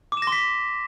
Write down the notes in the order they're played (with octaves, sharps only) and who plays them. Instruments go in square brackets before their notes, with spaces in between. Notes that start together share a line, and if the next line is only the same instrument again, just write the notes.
[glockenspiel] D6
E7
A#6
C6
B6